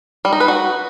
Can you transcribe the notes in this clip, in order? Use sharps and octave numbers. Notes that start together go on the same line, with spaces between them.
G3
D#4
B4
F#4